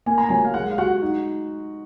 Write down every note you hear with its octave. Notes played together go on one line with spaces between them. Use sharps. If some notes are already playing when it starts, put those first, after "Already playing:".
A#3 G#5
A#5
F#3 G#5
F5
G#3 F#5
F5
F#4 F#5
D#4